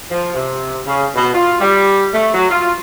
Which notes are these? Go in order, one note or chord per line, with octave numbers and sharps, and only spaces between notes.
F3
C3
C#3
B2
F4
G3
A3
F#3
F4